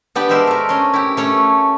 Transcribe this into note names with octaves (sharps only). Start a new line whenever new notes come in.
B3 D4 G4 B4
G#3 G4 A#4 C5 E5
A3 A#4
C#4 C6
E4 G4
A3 C#4 C#5